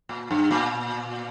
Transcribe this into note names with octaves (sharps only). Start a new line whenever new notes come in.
A#2
G2
A#2